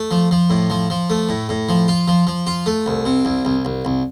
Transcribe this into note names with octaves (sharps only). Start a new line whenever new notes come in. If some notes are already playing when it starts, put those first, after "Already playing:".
Already playing: A3
F3
F3
A2
F3
F3
A3
A2
A2
F3
F4
F3
F3
F4
A3
C2
C3
C2
C2
C2
C2